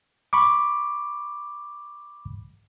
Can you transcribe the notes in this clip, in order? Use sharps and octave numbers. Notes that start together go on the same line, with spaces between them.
B5 C#6 D6